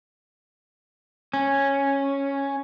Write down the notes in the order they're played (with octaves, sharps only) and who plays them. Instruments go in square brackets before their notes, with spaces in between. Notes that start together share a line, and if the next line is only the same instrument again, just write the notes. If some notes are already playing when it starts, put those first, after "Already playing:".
[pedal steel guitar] C#4